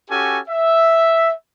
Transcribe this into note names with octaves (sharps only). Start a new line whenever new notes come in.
C#4 F#4 G4 A4 G#5
E5